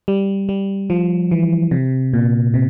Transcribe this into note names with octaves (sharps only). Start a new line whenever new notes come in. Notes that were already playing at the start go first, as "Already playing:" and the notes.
G3
G3
F3
E3
C3
A#2
C3